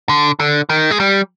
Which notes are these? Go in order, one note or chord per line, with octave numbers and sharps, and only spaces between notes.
D3
D3
D#3
G#3
G3